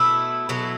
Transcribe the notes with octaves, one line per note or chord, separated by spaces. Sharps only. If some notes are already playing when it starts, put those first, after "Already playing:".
Already playing: B2 A3 E4
B2 F#3 A3